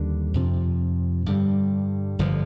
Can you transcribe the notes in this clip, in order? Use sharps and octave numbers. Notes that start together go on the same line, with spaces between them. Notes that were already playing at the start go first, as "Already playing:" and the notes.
Already playing: D#2 D3 G3 D4
F2 C3 F3
G2 D3 G3
G1 G2 D3 F3